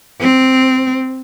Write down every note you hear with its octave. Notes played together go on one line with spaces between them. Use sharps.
C4